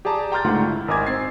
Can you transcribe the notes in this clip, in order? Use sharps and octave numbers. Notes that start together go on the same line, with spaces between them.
G4 G#4 D5 A5 A#5
G5 A#5 C6 F6 G6 A6
C#2 G#2 D3 A3 F4 F#5
E4
G#1 A#4 D#5 G#5 D6 G#6
C4 G#6 A6 C7